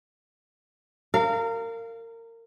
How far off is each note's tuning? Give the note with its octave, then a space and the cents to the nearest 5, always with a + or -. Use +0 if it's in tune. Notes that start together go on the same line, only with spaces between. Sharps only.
A#4 -25 F5 -10